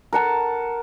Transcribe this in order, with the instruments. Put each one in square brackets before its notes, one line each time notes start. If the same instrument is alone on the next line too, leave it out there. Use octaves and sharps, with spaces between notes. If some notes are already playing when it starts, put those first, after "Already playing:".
[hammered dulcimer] A#4 F#5 A5